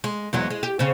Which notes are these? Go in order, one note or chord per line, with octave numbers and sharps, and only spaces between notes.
G#3
E2 F#3 G#3
G#3
G4
C#3 C4